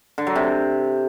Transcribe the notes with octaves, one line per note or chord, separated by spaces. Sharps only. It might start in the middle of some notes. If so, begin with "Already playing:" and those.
D3
F#3
C3